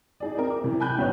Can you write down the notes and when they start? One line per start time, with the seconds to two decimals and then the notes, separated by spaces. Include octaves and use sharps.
0.20 D#4 G#4 D5
0.37 C4 A#4
0.50 D6
0.64 C3 E3
0.80 G5 G#5 B5 F#6 G6
0.98 G1 D2 B2 B4 C#5 D#5